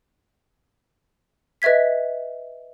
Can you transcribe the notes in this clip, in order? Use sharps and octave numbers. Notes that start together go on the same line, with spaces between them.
B4 D#5 E5 G#6 B6